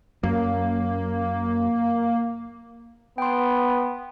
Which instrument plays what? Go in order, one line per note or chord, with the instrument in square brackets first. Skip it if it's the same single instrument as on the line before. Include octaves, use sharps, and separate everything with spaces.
[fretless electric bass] F#2 [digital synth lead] A#3
[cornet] B3 [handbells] G5 C6